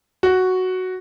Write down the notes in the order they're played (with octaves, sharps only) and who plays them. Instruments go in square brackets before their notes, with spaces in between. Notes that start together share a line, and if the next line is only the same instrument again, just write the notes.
[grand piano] F#4